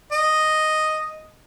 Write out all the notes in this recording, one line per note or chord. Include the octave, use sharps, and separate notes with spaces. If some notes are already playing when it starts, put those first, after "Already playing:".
D#5